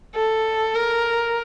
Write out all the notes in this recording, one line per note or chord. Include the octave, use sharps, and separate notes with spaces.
A4
A#4